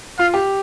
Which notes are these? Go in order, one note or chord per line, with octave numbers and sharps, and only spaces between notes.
F4 F5
G4